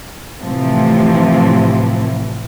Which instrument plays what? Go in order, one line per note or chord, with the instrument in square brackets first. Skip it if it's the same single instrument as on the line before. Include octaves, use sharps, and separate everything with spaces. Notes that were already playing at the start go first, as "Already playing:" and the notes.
[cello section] A2 C3 E3 F3 C4